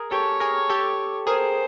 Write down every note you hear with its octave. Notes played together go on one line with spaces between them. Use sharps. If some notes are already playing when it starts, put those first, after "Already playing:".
Already playing: G#4 A#4
G4 A4 C#5
G#4 A#4
G4 A4
G#4 A#4 C5